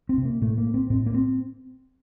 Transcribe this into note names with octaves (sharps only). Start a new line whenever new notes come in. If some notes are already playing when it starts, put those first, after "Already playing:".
C4
C3
A#3
A2 A3
A#3
C4
A2 C4
A#3
C4